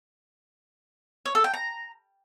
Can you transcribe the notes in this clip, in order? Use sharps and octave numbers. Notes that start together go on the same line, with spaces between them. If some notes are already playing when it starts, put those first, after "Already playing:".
C#5
A4
G5
A#5